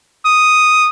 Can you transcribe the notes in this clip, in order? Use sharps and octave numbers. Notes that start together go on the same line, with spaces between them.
D#6